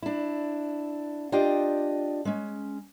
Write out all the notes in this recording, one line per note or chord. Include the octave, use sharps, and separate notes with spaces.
D4 E4
D4 F4 G4 D#5 G5
G#3 C#4